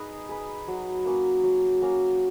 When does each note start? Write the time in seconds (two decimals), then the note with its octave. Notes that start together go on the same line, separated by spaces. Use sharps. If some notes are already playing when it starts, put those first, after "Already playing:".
Already playing: D#4 G#4 B4
0.29 G#4 B4
0.68 F#3
1.05 A#3 C#4 F#4
1.43 F#3
1.82 A#3 C#4 F#4